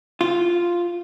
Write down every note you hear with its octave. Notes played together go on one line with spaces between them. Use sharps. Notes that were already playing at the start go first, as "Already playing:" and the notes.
F4